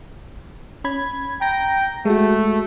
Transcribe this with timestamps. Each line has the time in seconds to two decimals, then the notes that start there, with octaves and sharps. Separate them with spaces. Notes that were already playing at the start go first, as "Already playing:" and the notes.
0.84 C#4 B5 G#6
1.41 G5 A#5 A#6
2.05 G#3 A3 F#4